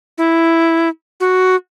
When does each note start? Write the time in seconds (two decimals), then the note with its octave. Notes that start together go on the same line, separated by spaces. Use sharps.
0.18 E4
1.20 F#4